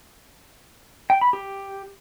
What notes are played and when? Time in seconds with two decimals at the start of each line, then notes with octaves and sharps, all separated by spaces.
1.10 G5
1.21 B5
1.33 G4